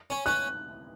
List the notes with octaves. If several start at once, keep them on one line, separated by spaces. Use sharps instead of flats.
C#4
C#4 F#6